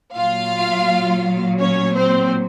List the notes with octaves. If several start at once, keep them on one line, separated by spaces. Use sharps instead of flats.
A#2 F#3 F4 F5
C#4 C#5
C4 C5